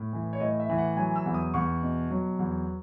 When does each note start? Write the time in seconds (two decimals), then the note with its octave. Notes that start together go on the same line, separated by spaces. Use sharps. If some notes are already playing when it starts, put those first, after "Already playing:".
Already playing: A2
0.13 E3
0.33 C#5
0.40 A2 D#5
0.60 E5
0.70 E3
0.78 F#5
0.97 F#3 G#5
1.16 E6
1.26 E2
1.34 D#6
1.54 E2 C#6
1.82 B2
2.11 F#3
2.39 E2